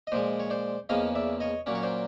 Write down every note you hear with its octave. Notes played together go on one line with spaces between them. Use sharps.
D#5
A#2 F3 G#3 C5 D5
C#5
C5 D5
E2 C#3 F3 A#3 C#4 D#5 F5
D5 E5
C#5 D#5
A#2 F#3 A#3 C#4 D5
C#5
C5 D5